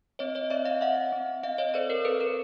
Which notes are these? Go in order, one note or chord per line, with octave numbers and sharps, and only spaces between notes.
C4 C#5 D#5
C#5 D#5
C4 D5 E5
D#5 F5
C4 E5 F#5
C4
C4 D#5 F5
C#5 D#5
A4 C5 D5
A#4 C5
C4 A4 B4
A#4